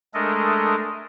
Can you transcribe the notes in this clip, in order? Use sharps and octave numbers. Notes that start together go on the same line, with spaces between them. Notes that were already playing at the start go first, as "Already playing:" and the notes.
G#3 A3 D4 A4 A#4 D#5